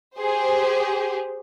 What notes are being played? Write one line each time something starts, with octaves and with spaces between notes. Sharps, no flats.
G4 G#4 C5